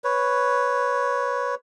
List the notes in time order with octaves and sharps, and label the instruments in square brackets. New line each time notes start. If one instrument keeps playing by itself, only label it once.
[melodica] B4 C#5